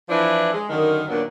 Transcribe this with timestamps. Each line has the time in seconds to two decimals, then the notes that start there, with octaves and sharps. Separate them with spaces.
0.09 E3 F3 D4 E4 B4
0.53 G#3
0.69 F#2 D3 D#3
1.08 D#2 A#2 F#3 B3 D4